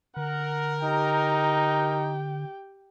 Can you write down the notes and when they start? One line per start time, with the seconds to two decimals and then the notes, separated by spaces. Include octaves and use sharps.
0.17 D3 A#4 F#5
0.84 D#4 G4 G5